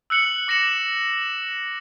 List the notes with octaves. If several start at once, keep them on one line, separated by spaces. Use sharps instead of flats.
E6 F#6 C#7 F#7
D6 A#6 C#7 E7 F#7